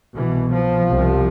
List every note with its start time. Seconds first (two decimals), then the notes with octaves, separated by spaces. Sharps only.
0.16 C2 B2 E3
0.52 F3
0.89 C2 C3